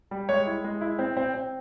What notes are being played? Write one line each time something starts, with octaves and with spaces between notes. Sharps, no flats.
G3
G#3 C#5
E4
G#3
E4
C4
C4
C4